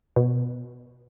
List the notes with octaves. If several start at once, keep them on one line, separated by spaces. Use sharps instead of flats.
B2